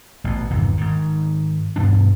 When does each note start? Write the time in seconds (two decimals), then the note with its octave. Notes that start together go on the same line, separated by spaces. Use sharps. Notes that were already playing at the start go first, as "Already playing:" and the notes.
0.24 A1 B2
0.50 G1 E2 C3 D#3
0.78 G#2 D#3
1.76 G2 B2 E3 D4